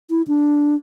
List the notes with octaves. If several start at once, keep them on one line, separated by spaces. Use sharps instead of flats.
E4
D4